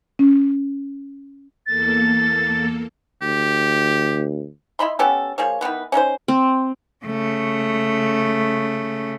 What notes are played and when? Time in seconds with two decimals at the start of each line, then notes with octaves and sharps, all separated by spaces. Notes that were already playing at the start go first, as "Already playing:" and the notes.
0.19 C#4
1.67 E2 A#3 A4 A6
3.21 D2 G4
4.79 E4 D#5 B5 C6
4.99 B3 C#4 G4 A4
5.38 F3 A#3 G#4 C#5
5.61 D#3 E3 B3 B4
5.92 C#4 D#4 A#4 C5
6.28 C4
7.05 C#3 A3